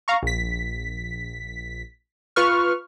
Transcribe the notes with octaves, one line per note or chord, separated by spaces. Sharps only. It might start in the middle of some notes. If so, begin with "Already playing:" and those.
F5 A#5 C#6
A#1 B6
F4 B4 C#6 F6